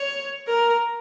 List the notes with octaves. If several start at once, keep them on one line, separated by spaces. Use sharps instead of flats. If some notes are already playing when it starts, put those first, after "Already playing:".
Already playing: C#5
A#4